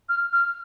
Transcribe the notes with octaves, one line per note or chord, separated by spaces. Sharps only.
F6
F6